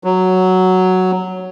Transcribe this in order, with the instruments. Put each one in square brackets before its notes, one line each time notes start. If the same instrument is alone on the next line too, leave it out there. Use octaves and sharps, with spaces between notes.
[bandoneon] F#3